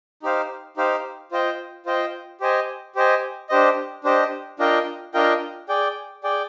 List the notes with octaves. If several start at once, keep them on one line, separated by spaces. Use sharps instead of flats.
D#4 G4 C5 F5
D#4 G4 C5 F5
F4 C5 D#5 G5
F4 C5 D#5 G5
G4 C5 D#5 G#5
G4 C5 D#5 G#5
D4 G4 C5 D#5
D4 G4 C5 D#5
D4 F4 A#4 D#5 G5
D4 F4 A#4 D#5 G5
G#4 D5 G5
G#4 D5 G5